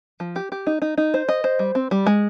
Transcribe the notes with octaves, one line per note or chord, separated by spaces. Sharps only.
F3
G4
G4
D#4
D#4
D#4
C5
D#5
C5
G3
C4
G3
G#3